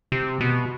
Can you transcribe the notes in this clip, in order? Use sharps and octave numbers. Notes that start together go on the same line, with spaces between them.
C3
B2